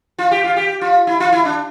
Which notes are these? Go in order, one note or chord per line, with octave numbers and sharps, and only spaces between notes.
F4
G4
F4
G4
F4
E4
F4
E4
D4